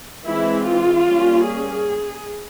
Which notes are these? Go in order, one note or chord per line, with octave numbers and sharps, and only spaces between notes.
E3 G#3 C4 E4
F4
G3 A#3 C#4
G#4